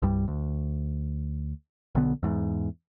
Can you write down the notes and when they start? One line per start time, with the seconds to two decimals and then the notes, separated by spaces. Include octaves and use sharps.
0.02 C2 G2 G3
0.28 D2
1.95 B1 D3 B3
2.23 E2 G#2